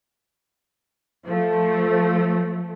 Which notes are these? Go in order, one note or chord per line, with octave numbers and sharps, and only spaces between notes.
F3 A3